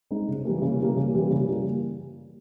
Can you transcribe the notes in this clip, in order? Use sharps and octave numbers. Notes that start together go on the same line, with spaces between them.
G#3 C4 D#4
C#3
E3 G3 A#3
C#3
E3 G3 A#3
C#3
E3 G3 A#3
C#3
E3 G3 A#3